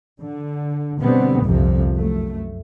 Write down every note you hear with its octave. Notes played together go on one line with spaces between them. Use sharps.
D3
B2 D3 G3 B3 C4
G1 C2 F2 C3 F3
F#2 A3